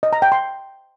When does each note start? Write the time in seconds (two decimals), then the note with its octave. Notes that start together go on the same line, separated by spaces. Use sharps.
0.03 D#5
0.13 A#5
0.22 G5
0.32 C6